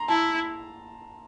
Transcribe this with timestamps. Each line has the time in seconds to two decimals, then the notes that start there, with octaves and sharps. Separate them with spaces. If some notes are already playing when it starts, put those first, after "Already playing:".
Already playing: A#5 C6
0.08 E4 A5